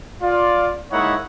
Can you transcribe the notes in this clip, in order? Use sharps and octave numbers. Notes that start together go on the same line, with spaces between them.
F4 D5
G#3 A#3 D#4 E4 C#5 F#5